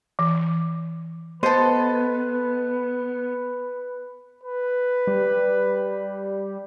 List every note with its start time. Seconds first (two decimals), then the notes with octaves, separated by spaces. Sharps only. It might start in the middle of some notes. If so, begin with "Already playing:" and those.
0.19 E3
1.43 B3 A4 B4 C5 D#5
4.44 B4
5.07 G3